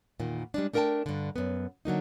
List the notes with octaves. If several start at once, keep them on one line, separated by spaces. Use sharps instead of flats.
E2 A#2 D#3
G3 G#3 D4
A3 D4 A#4 F5 G5 A5
G2 D3
F#2 B3
D3 F#3 A#3 D#4